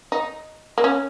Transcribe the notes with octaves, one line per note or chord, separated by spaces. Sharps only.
D#4
A#3
C#4